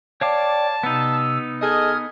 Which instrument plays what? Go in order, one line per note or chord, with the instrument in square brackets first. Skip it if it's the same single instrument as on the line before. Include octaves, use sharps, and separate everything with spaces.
[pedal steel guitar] C#5 F5 D6 [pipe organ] D5 G5 [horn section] A5
[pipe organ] C3 E6 [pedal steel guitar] B3 D#4
[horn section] G#4 A4 D#5 [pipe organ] D#6 F6 G#6